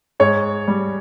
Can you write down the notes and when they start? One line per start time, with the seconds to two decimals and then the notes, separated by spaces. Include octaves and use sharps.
0.20 G#2 C#5
0.68 G3